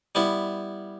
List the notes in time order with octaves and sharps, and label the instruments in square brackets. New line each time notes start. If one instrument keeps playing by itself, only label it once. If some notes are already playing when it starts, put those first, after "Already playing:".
[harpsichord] G3 B3 E4